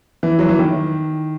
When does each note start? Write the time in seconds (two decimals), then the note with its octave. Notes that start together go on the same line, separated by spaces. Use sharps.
0.23 E3
0.39 F#3
0.49 E3
0.59 D#3